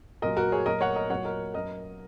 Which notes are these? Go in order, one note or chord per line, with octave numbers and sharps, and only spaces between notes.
A#2 F#3 A#4 D#5
F#4 A#4
G#4 C#5
A#2 F#3 A#4 D#5
C#5 F#5
A#4 D#5
A#2 F#3 C#5 F#5
A#4 D#5
F#2 F#3 A#4 D#5